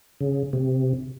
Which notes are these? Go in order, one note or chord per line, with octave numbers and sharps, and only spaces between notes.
C#3
C3